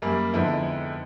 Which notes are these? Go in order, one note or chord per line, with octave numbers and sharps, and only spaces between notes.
F#2 G3 A#3
F2 G#2 D3 B3 E4